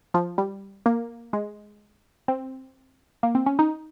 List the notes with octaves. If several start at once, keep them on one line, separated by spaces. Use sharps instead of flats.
F3
G3
A#3
G#3
C4
A#3
C4
C#4
D#4